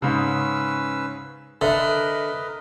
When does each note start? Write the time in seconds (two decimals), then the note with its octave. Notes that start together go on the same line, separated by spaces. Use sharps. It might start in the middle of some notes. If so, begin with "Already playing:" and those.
0.02 G#2 C#3 C#4 B4 E6
1.61 D3 A#4 B4 D#5 E5